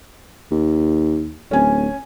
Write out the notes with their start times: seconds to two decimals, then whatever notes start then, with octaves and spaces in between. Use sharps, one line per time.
0.51 D#2
1.51 D1 C#4 G#5